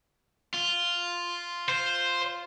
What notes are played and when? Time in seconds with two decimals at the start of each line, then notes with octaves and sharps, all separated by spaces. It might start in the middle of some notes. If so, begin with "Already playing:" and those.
0.54 F4
1.68 C5